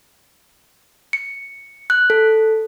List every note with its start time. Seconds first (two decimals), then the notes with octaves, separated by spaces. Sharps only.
1.13 C#7
1.90 F#6
2.10 A4